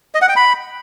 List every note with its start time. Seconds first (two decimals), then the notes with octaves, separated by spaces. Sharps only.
0.15 D#5
0.22 F#5
0.29 G5
0.36 B5